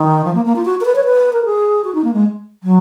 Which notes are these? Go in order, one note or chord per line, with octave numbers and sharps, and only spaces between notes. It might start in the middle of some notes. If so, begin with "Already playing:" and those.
Already playing: D#3
F3
A#3
A#3
F4
F#4
A#4
B4
C#5
B4
A#4
G#4
F#4
D#4
A#3
G#3
F#3